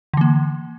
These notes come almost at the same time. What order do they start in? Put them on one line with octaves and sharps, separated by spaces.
D3 E3 A#3